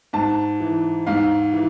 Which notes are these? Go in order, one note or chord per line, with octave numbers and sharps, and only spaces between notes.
G#2 A5
E3
G#2 F5
E3